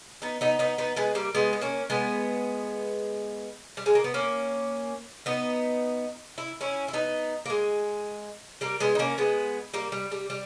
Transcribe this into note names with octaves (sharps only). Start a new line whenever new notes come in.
B3 D#4
B3 D#4
B3 D#4
B3 D#4
G#3 B3
G3 A#3
G#3 B3
B3
A#3 C#4
G#3 B3
G3
G#3
A#3
B3
A#3 C#4
B3 D#4
E4
C#4 E4
E4
B3 D#4
A#3
G#3
G3 A#3
G#3 B3
D#4
A#3 C#4
G#3 B3
G3 A#3
G3
G3
G3